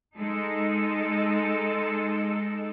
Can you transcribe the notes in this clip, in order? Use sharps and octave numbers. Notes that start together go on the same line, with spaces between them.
G#3 D#4 A4